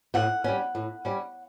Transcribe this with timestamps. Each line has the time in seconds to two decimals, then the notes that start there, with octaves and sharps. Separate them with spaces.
0.14 A2 F#5
0.44 G3 C#4
0.75 A2
1.05 G3 C#4